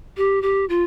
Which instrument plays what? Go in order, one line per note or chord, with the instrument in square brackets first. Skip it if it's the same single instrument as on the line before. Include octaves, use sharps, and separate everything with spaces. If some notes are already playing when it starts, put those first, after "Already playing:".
[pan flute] G4
G4
F4